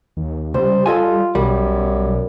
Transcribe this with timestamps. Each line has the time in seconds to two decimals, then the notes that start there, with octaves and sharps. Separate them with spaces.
0.17 D#2
0.54 C#2 G3 C5
0.86 F4 A4 D#5 G#5
1.35 B1 F#2 G3